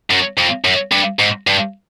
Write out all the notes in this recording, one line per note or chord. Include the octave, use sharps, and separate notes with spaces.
F#2
F2
F#2
G2
G#2
G2